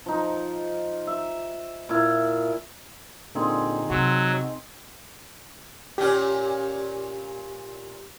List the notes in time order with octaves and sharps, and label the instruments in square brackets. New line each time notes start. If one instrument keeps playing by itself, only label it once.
[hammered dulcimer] F3 D#4
E5
A#2 E4
[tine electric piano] A#2 D3 [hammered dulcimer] C4 D#4 G#4
[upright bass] C3 [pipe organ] F#3 [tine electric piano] F#4 E6
[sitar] A#2 C#4 [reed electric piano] G4